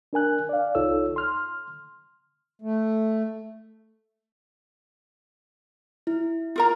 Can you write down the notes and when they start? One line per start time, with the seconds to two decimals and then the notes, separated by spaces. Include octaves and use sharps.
0.13 D4 A#4 G#5 F#6
0.49 D5 F5
0.75 C2 D#4 F4 A4 C#5 E6
1.16 C6 F6
2.62 A3
6.07 E4
6.56 F4 A#4 A#5